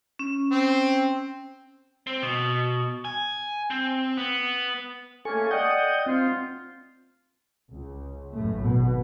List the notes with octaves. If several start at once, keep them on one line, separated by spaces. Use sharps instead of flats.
C#4
C4
C4
B2
G#5
C4
B3
A3 A#3 C#4 A4 G#5 C#6
D5 D#5 F#5 G5 D#6 G6
C4 F4
C#2
A1 F#2 A2 A3
G#1 B2 B3